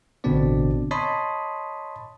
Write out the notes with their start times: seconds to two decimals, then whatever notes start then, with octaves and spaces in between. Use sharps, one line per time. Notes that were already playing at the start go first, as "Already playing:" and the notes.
0.24 A1 B2 D3 C4 D4 D5
0.91 C#5 D#5 A5 B5 C6 D#6